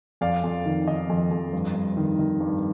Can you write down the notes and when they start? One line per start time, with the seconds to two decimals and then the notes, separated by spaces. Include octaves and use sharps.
0.21 F2 D5 F5
0.44 F2
0.65 D#3
0.87 D#3 D#5
1.10 F2
1.31 F2
1.52 G2
1.74 G2
1.97 D#3
2.19 D#3
2.40 G2